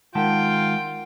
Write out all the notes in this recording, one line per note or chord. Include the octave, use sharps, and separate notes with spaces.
D#3 G#3 F4 A#4 F#5 G5 A5